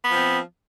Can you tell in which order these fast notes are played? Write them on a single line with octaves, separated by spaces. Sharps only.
B3 F3 C4